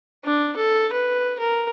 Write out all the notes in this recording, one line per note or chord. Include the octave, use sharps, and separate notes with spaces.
D4
A4
B4
A#4